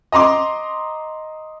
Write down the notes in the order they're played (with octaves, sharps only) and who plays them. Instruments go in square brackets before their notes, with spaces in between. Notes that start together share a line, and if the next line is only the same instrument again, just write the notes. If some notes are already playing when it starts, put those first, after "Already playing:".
[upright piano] D#5 A#5 C6 D6